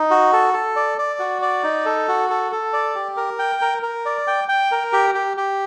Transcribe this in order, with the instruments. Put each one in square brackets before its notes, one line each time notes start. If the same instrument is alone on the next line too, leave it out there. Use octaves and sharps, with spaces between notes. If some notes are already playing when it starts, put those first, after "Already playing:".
Already playing: [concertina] D#4
F#4
A4
A4
D5
D5
F#4
D5
D#4
A4
F#4
A4
A4
D5
G4
A#4
G5
A#4
A#4
D5
G5
G5
A#4
G4
G4
G4